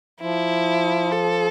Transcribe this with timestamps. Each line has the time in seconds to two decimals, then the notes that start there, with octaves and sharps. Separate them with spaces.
0.21 F3 E4
1.12 A4